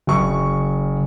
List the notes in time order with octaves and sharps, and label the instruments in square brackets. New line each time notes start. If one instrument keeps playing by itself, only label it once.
[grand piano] F#1 C#6